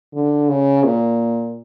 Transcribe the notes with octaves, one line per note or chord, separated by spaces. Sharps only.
D3
C#3
A#2